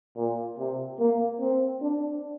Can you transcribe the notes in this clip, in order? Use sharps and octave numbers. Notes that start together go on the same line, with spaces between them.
A#2
C3
A#3
C4
D4